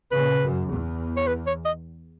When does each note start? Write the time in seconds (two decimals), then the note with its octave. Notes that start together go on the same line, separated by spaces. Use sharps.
0.12 A#2 C#3 B4
0.42 F#2
0.70 E2
1.17 C#5
1.27 B4
1.47 C#5
1.65 D#5